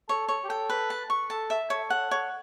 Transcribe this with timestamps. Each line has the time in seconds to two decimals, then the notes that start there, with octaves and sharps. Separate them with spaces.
0.08 A4 C#5
0.29 C#5
0.44 G4
0.49 A4 G5
0.70 B4
0.90 A5
1.10 C#6
1.30 A4 A5
1.50 E5
1.70 A4 C#5
1.90 F#5
2.11 C#5